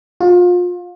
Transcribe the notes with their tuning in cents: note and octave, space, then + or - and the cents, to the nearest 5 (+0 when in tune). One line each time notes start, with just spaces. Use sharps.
F4 +30